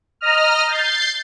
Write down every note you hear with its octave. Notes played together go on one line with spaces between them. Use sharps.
D#5 A#5 D#6 F6
G6 A6 C7